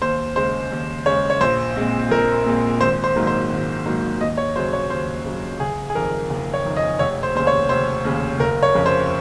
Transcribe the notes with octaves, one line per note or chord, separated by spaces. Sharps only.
D#2 C5
C#3 G#3 C5
D#2
C#3 G#3 C#5
C#5
A#1 C5
A#2 G#3 C4
A#1 A#4
A#2 G#3 C4
G#1 C5
C5
G#2 D#3 F#3 A#3
C5
G#1
G#2 D#3 F#3 A#3
D#2 D#5
C#5
C#3 F#3 C5
C#5
D#2 C5
C#3 F#3
F#1 G#4
G#4
F2 D#3 A#4
F#1
C#5
F2 D#3
D#5
F1 C#5
C5
D#2 C#3 C5
C#5
F1 C5
D#2 C#3
F#1 A#4
C#5
F2 C#3
C5